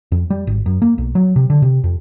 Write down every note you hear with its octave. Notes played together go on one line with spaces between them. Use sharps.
F2
G3
G#1
F#2
A#3
B1
F#3
C3
D3
C3
F2